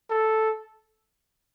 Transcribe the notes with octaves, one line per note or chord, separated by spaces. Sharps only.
A4